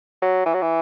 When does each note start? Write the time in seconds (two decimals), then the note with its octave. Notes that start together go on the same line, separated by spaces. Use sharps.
0.22 F#3
0.46 E3
0.54 F#3
0.62 E3